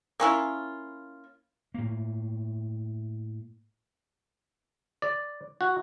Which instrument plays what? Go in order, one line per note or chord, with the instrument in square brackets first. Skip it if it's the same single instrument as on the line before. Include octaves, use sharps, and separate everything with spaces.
[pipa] A#3 C#4 E4 F4
[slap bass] A2 A#3
[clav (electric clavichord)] D5
F#4